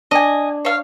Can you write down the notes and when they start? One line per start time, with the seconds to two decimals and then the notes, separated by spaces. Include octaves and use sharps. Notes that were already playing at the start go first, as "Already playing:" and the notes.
0.11 D4 D#5 G#5
0.65 C#5 F5